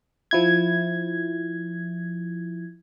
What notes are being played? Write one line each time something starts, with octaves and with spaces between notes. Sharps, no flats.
F3 E4 G#6